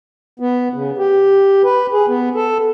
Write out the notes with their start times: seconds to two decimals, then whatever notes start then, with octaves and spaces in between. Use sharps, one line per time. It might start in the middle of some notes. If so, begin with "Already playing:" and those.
0.40 B3
0.74 C#3
0.98 G4
1.64 B4
1.92 G#4
2.08 B3
2.35 A4